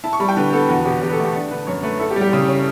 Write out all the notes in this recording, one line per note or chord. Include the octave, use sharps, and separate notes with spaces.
E4 A5
C#6
G3 B5
G5
D3 B4
B3 A4
E2 F#4
B2 G4
E2 G4
B4
A4
A3
G4
D4
D3 B4
F#2 C#5
A3 B4
E4 A4
G4
G3
G4
C#3
C#4